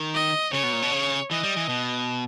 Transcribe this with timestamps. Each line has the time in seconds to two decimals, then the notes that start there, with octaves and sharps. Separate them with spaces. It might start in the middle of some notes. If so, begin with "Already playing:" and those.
Already playing: D#3
0.14 D#5
0.53 C#3 C#5
0.63 B2
0.73 A#2
0.82 B2
0.92 C#3
1.31 E3 D#5
1.43 G3
1.57 E3
1.69 B2